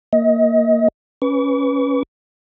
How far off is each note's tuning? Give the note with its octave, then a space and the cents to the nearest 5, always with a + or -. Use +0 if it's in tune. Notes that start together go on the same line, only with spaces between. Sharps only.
A#3 +0 D#5 +30
C#4 +0 B4 +0 C#6 +45